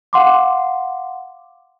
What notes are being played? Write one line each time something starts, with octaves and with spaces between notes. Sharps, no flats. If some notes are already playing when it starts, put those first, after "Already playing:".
F5 F#5 C6 D6